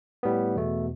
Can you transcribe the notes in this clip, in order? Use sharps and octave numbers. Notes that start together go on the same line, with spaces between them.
A2 G3 B3
E2 B2 A3